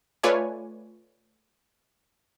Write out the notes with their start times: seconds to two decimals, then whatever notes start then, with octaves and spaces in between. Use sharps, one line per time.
0.23 A3 F4 B4 C#5 D5 G#5